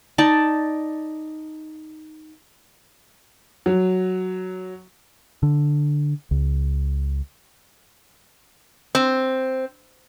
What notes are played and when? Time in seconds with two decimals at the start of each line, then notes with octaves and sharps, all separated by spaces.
0.18 D#4 D5 A5
3.66 F#3
5.43 D3
6.31 C#2
8.95 C4